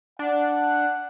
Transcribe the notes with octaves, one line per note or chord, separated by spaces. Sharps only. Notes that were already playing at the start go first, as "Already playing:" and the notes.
D4 F#5